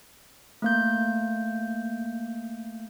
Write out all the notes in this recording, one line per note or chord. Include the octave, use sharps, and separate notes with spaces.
A3 A#3 G6